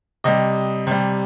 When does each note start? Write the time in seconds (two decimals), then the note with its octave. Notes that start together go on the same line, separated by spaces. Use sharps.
0.24 C3 G3 D#5
0.87 C3 G3